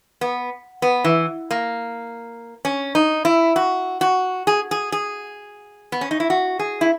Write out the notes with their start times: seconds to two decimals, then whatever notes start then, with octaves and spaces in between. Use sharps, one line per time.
0.21 B3
0.82 B3
1.04 E3
1.51 A#3
2.65 C#4
2.95 D#4
3.25 E4
3.56 F#4
4.01 F#4
4.47 G#4
4.71 G#4
4.92 G#4
5.92 B3
6.01 C#4
6.11 D#4
6.20 E4
6.30 F#4
6.59 G#4
6.81 E4